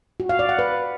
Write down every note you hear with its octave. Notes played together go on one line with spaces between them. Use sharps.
F#4
F5
D5
F#5
B4